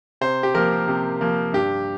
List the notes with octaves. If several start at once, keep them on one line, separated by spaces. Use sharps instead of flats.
C3 C5
G4
F3 A#3 A#4
C3
F3 A#3
G2 G4